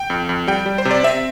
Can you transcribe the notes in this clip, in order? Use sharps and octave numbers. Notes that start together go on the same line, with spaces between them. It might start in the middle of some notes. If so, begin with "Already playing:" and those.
Already playing: G5
F2
F2
G3 G5
G3
C5
C3
D5
C4 E5